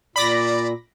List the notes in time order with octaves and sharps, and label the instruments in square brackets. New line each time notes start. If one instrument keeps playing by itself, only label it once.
[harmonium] A#2 [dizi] D5 [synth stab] B5 D6 A#6